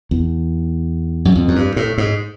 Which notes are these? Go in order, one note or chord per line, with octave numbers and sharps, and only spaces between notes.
E2
F#2
F2
F#2
G2
A2
G#2